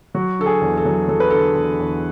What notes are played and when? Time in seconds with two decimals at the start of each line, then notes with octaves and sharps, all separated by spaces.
0.15 F#3 F#4
0.39 D3 A4
0.46 G#4
0.61 E2
0.77 A4
0.85 F#3
1.08 F#3 A4
1.20 B4
1.30 D3 A4
1.55 E2
1.80 E2